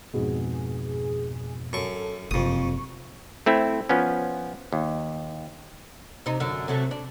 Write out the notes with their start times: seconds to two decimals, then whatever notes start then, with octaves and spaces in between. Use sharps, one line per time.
0.14 F2 G#2 B2 G#4
1.73 F#2 A4 C#6
2.31 F#1 F2 C3 C#6 D#6
3.46 A3 C4 E4
3.89 F3 B3 C#4
4.73 D#2
6.26 C3 D#4
6.40 F#2 D3
6.68 C3 F#3 A3
6.91 D4